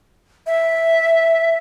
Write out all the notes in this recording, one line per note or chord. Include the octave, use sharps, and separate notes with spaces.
E5